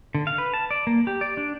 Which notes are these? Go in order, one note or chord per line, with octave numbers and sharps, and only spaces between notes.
D3
F5
B4
A5
D5
A#3
G4
D5
D4